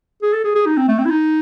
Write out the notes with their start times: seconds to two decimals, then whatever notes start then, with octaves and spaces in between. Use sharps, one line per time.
0.22 G#4
0.33 A4
0.44 G#4
0.55 G#4
0.66 D#4
0.77 C4
0.88 A3
0.99 C4
1.05 E4
1.10 D#4